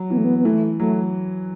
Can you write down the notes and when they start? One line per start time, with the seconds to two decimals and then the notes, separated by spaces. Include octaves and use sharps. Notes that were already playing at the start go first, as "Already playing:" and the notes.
Already playing: F#3
0.10 E3 B3
0.17 A3
0.24 B3
0.38 B3
0.45 E3 A3
0.79 F#3 A3